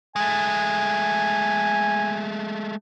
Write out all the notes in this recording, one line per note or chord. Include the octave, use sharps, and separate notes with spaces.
G#3 A3 G#5